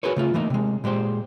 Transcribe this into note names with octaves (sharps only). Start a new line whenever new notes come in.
F#4 G#4 A#4 B4 C#5
C#3 A3 F4
E3 A3 A#3 D#4
C3 G#3
A#2 G#3 G4 C5